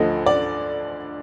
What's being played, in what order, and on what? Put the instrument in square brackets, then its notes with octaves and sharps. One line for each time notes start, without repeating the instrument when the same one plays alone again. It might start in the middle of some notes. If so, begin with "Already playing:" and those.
Already playing: [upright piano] D2 D3 F3 D#5
D5